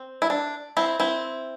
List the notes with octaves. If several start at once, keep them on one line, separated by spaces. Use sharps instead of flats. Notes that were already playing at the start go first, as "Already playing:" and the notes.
Already playing: C4
E4
D4
C4 E4
C4 E4